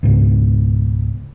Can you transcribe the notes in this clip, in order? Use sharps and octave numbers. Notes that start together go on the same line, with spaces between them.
C#2 G#2 B2